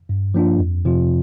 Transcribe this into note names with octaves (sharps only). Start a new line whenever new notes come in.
G2
F3 A#3 D4 F4
F2
C3 F3 C4 F4